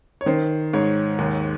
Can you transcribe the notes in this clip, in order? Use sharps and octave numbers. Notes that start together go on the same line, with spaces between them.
C#5
D#3 C5
G#2 C#5
D#2